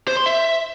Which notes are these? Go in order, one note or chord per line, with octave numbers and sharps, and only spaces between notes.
C5
C6
E5